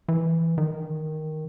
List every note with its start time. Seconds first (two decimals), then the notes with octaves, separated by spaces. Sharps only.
0.08 E3
0.58 D#3